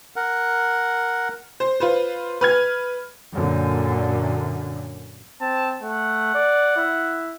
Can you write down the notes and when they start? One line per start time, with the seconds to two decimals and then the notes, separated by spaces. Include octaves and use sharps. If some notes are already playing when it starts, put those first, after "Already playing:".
0.16 A#4 F#5
1.60 C5
1.80 F4 B4 C5
2.41 B4 F6 G#6
3.32 F#2 A#2 D3
5.41 C4 A5
5.82 A3 F#5
6.35 D5
6.76 E4